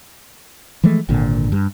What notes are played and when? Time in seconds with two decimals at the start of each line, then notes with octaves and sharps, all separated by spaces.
0.84 E3 F3 G#3 A3
1.09 G#1 A#2 D3
1.52 G2